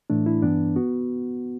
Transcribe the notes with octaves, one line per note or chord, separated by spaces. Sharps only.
A2 E3 A3 D4
E4
G2 E3 B3 D4
B3 F#4